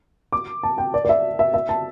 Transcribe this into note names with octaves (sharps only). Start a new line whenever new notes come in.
D6
A5
G5
D5
D5
E5
E5
E5
A5